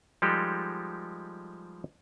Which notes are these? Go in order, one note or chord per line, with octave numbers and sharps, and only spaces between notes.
F3 G3 G#3 D#4 G4 A4